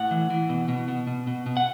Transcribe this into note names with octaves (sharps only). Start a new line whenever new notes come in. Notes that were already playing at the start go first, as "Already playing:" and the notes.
Already playing: A2 F#5
E3
E3
B2
B2
B2
B2
B2
B2
F#5